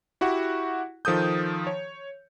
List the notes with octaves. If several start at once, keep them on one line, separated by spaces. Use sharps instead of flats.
E4 F#4 G4 F#5
D#3 F3 A4 D#6 G6
C#5